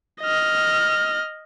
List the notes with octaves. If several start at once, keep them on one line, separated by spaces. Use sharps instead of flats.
D#5 F6